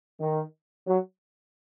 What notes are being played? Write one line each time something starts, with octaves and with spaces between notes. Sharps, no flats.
D#3
F#3